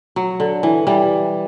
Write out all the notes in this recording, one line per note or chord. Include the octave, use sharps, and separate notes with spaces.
F#3
D3
E3
E3 G3